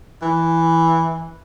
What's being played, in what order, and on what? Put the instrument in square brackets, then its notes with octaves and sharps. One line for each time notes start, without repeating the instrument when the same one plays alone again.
[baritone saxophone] E3